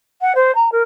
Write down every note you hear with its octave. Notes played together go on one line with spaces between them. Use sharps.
F#5
C5
A#5
A#4